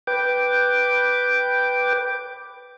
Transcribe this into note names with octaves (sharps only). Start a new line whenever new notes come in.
B4 G5 D6